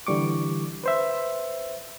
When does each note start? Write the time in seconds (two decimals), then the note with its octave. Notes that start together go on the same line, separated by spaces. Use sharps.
0.07 D3 E3 G3 C#6 D6
0.84 B4 C5 E5